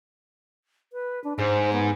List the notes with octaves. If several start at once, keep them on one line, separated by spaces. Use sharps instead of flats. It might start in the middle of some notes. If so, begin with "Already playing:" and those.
B4
D4
G#2 C5
B3